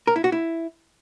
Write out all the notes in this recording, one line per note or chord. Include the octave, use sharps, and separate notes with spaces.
A#4
E4
F#4
E4